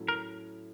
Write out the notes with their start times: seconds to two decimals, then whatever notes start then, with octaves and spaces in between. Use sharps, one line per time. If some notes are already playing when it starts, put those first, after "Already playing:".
Already playing: A2 F#3 A3 C#4
0.08 A#4